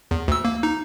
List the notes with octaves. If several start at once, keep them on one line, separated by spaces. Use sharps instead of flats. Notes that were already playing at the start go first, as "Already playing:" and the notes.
E2
D2 E6
A#3
D#4